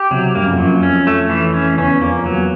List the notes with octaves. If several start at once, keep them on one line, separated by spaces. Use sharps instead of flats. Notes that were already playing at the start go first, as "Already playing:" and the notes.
Already playing: G4
C3 F#3
G2 A#3
F#2
F2
F#2 F#3
F2 C#4
A3
E3
C#4
E2 C#4
F2 A#3
E2 F#3